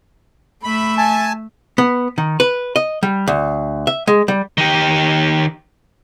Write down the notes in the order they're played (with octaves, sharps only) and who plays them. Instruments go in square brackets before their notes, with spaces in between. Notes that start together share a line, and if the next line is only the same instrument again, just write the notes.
[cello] A3 E5 [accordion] B5
[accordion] G#5 A5
[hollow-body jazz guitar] B3
D#3
B4
D#5
G3
D2
E5
G#3
G3
[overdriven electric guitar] D#3 G4